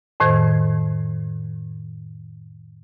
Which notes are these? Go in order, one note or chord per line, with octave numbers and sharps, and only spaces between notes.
F2 A2 D#3 C5 G#6